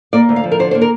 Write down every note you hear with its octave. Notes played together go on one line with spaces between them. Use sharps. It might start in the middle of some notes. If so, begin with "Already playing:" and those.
A#3 D5
D2
F5
F3
A#4
D3 C5
A#3 C5
A#4